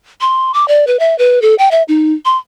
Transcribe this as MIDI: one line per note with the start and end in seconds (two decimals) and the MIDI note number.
0.21 0.52 84
0.54 0.67 86
0.68 0.85 74
0.87 0.99 71
0.99 1.17 76
1.18 1.42 71
1.42 1.55 69
1.58 1.71 79
1.71 1.83 76
1.88 2.13 63
2.25 2.37 84